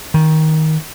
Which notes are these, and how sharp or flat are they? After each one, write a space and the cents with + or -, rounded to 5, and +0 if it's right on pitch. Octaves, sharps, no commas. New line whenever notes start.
D#3 +15